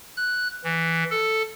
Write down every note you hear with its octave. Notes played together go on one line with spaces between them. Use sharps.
F#6
E3
A4